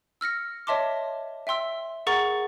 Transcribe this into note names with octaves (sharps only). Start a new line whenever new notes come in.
E6 F6 A#6 C#7
C#5 D#5 E5 A5 C6 D6
E5 G5 C6 E6
G#4 A#4 F#5 A#5 C#6 A6